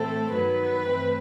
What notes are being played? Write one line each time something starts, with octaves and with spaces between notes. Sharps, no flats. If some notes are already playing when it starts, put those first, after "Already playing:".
Already playing: A2 E3 A3 C4 A4
G2 D#3 F#3 B3 B4
G2 E3 A3 C4